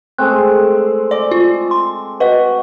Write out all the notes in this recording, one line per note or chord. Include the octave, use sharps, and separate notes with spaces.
G#3 A3 C4 F#6
D5 D6
F4
C6
F#4 B4 D#5